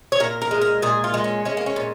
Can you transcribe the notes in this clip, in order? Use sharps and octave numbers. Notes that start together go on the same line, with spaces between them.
C#5
A#2 A#4
A#4
G#3
A#4
A#2 G#4
F4
G#3
C#4
G#3 C#4
A#3
C#4
A#2